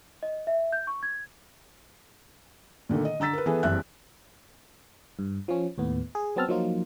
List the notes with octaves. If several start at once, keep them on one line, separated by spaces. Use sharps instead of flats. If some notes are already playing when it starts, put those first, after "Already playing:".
D#5
E5
G6
C#6
G#6
A#2 D3 D#3 A3
D#5
D3 A#5 E6 A6 B6
A#4 B4
E3 B3 G#4 A4 B4
F#1 G2 E3 C4 E5 F#6
G2
F3 C#4
D#2 A2 B3
G#4
F#3 B3 C4 A5 E6 F6
F3 F#3 A#3 D#4 F4